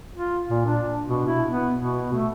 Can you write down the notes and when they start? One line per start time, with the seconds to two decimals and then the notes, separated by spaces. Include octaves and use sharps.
0.15 F4
0.50 A#2
0.66 D4
1.06 B2
1.27 E4
1.50 B3
1.76 B2
2.13 A3